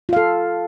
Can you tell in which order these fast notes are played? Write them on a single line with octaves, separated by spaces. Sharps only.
F4 F5 A4